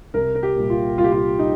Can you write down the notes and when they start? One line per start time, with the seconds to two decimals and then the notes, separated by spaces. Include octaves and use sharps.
0.14 C2 A#4
0.35 A#4
0.43 G4
0.56 A#2 G3
0.70 F4
0.97 C2 F4
1.04 G4
1.12 F4
1.39 G3 D#4